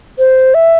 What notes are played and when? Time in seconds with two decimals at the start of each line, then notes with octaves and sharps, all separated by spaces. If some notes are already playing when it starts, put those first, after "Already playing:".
0.18 C5
0.54 E5